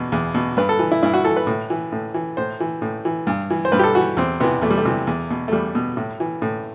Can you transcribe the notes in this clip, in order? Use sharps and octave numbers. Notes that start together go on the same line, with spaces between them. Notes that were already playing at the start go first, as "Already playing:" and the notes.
Already playing: E2 B2
E2
B2
G2 B4
A4
E3
E4
G2 E4
F#4
E3 A4
B4
A2
E3
A2
E3
A2 C5
E3
A2
E3
G2
E3
C5
G2 B4
G4
A4
E3 F#4
E2 C4
C3 E3 B3
E2 A3
G3
A3
C3 E3
E2
B2
A3
E2 G3
B2
A2
E3
A2